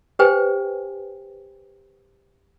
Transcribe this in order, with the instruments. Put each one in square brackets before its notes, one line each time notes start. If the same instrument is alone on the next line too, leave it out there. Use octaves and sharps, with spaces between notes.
[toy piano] G4 B4 C5 G5 G#5